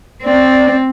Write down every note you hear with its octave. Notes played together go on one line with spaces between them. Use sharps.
C4 D5